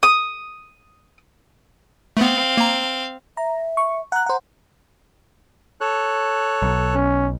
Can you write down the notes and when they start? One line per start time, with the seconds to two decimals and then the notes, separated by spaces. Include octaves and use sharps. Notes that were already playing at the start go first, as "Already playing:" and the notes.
0.03 D#6
2.17 A3 B3 C4 F5
2.57 A#3 A#5
3.37 E5 A#5
3.77 C#6
4.12 F#5 A#5 F#6
4.26 C5 F#5
5.81 A4 C#5 F#6
6.62 B1
6.94 C#4